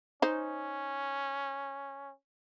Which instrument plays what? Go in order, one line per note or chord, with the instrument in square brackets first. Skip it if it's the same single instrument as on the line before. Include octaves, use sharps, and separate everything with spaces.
[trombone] C#4 [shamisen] D#4 C5